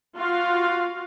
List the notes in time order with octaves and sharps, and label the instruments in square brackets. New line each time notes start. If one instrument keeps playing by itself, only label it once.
[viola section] F4 F#4 F5